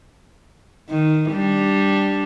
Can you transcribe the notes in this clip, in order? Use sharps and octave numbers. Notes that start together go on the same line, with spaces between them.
D#3
G3 D4